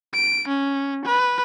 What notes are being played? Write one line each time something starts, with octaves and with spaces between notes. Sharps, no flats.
D7
C#4
B4